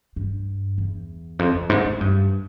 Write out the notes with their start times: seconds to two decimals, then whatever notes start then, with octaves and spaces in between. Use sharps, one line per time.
0.16 G2
0.78 E2
1.39 F2
1.54 F2
1.70 G#2
1.85 G#2
2.01 G2